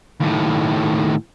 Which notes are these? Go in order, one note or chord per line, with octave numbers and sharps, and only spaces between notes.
D#2 A2